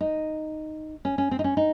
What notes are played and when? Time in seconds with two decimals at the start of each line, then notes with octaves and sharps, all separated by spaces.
0.01 D#4
1.05 C#4
1.18 C#4
1.31 C4
1.39 D#4
1.44 C#4
1.57 D#4